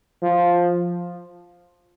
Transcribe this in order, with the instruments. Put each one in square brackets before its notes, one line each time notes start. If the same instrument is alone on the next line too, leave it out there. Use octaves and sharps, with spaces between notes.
[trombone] F3